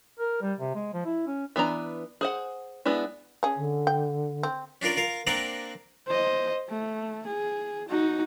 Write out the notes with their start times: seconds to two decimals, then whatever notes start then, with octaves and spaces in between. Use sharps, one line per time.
0.19 A#4
0.42 G3
0.59 C3
0.75 G#3
0.94 F3
1.05 E4
1.27 C#4
1.56 E3 B3 D4 A#5
2.21 G#4 C5 F#5
2.85 G#3 B3 D4 E4
3.43 C#4 G#4
3.57 D3
3.87 G5
4.43 C4
4.82 C#4 D4 F4 A#4 D5
4.97 F4 A#4 F5
5.27 A#3 C4 D4 A#4 D5 F#5
6.07 C5 D#5
6.69 A3
7.26 G#4
7.89 D#4 F#4